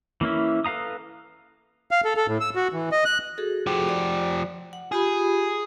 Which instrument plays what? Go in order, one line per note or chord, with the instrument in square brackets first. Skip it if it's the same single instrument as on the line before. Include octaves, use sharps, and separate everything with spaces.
[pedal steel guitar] E3 A#3 C#4 E4
A4 B4 F5 A#5 D#6
[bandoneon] F5
A4
A4
A2
E6
F#4
E3
D#5
F#6
[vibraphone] F#4 G#4 A4
[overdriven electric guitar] F3 G4
[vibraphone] D5
F#5
[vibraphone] F4 G4 B5 [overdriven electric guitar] G#4